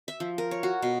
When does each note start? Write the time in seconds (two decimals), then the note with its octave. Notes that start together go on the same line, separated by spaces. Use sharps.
0.08 E5
0.20 F3
0.38 A#4
0.51 C#5
0.63 F#4
0.82 B2